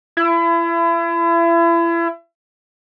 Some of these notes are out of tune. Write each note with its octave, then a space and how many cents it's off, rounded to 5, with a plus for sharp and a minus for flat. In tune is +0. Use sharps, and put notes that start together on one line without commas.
E4 +35